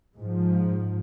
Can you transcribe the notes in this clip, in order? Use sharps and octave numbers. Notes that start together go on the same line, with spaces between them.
G#2 F3